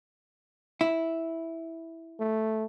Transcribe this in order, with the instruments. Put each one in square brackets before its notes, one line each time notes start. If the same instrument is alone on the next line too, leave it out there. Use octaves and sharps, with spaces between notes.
[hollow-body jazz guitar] E4
[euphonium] A3